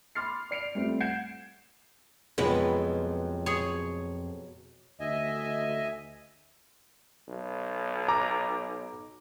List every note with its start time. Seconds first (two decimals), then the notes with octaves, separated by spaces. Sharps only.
0.15 B5 C6 D6 F6 A6 C7
0.51 D5 C7 D7 F7
0.75 G3 A3 C4 F4
1.00 F#5 G6 G#6 C7 D7 E7
2.38 F2 B2 F3 F#3 G#3 B3 B4
3.46 G#4 C#5 C6
5.00 D2 D#5 E5 G#5
7.28 B1
8.08 A#5 D6